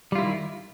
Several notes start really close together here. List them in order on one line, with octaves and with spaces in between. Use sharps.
G3 F4 E4 D#3